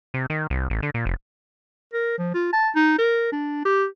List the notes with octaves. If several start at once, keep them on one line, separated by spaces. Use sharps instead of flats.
C3
D#3
C2
A1
D3
A#2
F1
A#4
F3
F4
A5
D#4
A#4
D4
G4